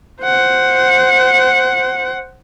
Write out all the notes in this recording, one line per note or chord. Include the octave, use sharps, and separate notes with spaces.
C5 F#5